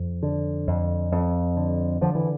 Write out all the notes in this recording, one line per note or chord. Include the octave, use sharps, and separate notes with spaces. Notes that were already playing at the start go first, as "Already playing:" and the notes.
Already playing: F2
D3
F2
F2
D3
D3 F3
E3